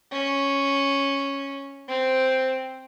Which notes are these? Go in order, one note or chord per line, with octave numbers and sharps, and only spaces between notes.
C#4
C4